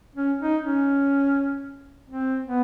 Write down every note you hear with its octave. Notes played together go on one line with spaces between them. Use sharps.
C#4
D#4
C#4
C4
B3